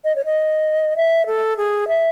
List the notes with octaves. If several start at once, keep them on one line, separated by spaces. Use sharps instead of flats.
D#5
C#5
D#5
E5
A4
G#4
E5